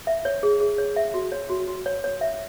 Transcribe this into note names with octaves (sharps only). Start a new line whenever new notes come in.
E5
C#5
G#4
G#4
C#5
E5
F#4
C#5
F#4
F#4
C#5
C#5
E5